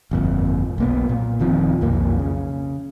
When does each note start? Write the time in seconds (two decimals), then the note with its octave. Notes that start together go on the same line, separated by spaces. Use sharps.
0.11 G1 F2 A#2
0.78 B1 A#3 B3
1.09 A#2
1.39 F1 D#3 F3 C4
1.81 B1 F2 A#3
2.19 C#3